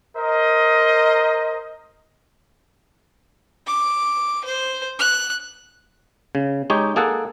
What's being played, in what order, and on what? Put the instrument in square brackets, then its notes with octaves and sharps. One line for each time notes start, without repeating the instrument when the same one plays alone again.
[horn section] A#4 C5 D#5
[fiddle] D6
C5
F#6
[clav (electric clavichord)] C#3
G#3 D#4 G4 C#5
A#3 G#4 A4 F#5